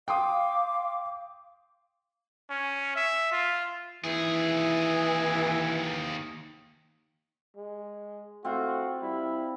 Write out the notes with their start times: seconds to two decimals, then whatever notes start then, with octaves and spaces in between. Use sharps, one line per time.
0.08 F5 G5 C6 D6 D#6
2.50 C#4
2.96 E5
3.32 F4
4.04 D#2 E3 G#4
7.56 G#3
8.45 A3 C4 F4 F#4
9.02 G3 E4